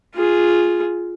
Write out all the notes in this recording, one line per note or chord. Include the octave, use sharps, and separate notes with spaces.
F4 G#4